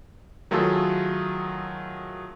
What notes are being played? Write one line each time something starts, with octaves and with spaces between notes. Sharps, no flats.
D#3 F#3 A3 F4 G#4 A4